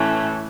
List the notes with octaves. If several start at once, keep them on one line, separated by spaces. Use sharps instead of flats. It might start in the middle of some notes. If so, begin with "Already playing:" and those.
Already playing: A2 E3 A3 C#4 E4